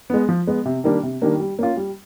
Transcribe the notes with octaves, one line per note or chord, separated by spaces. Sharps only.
G#3 B3
F3
G#3 B3
C3
D#3 G3 A#3 D4
C3
D#3 G3 A#3 D4
G3
A#3 C#4 F4
G3